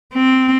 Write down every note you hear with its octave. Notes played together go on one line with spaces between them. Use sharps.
C4